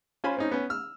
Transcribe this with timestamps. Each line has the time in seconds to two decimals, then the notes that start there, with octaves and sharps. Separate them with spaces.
0.24 C#4 F4 C5 G#5 B5
0.37 C4 C#4 D#4
0.51 B3 C#4
0.70 E6 F6